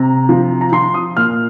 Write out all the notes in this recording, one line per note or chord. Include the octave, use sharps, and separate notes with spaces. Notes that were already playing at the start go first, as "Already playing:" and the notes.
Already playing: C3 A#5
F3
A#5
F3 C6
D#6
A#2 F6